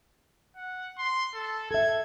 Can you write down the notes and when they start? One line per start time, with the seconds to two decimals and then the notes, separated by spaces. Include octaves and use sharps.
0.57 F#5
0.98 C6
1.35 A4
1.71 A4 E5 G#6